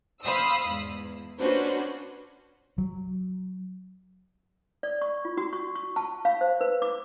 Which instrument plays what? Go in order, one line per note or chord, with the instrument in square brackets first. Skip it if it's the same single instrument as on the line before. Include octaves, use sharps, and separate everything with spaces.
[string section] C5 F5 B5 C6 D#6 E6
E2 G#2
A#3 C#4 D4 F#4 B4 C5
[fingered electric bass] F#3
[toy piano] D5
C#6
F4
F#4
C#6
C#6
A5
F5
C5
B4
D6